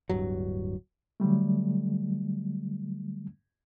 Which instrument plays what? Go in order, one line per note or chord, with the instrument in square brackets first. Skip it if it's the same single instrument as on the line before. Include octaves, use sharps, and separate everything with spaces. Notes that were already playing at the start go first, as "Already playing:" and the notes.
[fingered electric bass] D1 G2 F#3
[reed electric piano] D3 F#3 G3 A3